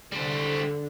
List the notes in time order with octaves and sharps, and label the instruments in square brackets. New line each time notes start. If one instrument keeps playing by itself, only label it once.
[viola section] D3 [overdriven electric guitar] G3 C5